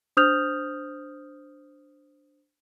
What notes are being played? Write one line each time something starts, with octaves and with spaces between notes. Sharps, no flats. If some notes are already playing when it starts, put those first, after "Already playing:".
D4 C5 D#6 F6 G6 F7